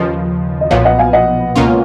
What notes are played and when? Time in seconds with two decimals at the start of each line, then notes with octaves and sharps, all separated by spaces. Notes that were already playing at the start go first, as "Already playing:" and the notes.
Already playing: D#2 C#3 F3 B4 D#5
0.61 D#5
0.70 B1 A#2 F3 B3 C#5 F5
0.85 D#5 F#5
0.98 F5 G#5
1.13 D#5 F#5
1.56 C#2 B2 A#3 C#4 F4